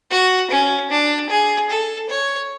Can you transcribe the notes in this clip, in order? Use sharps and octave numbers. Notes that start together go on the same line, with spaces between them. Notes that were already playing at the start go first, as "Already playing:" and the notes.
F#4
C#4
D4
G#4
A4
C#5